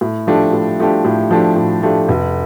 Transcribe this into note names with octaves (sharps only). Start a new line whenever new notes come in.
A2
F3 A3 D4 G4
A2
F3 A3 D4 G4
A2
F3 A3 D4 G4
A2
F3 A3 D4 G4
F1